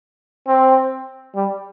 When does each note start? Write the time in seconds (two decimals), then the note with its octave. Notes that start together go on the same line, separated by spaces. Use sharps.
0.47 C4
1.35 G3